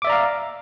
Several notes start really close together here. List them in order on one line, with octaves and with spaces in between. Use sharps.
D6 E5 D5 A#5 F5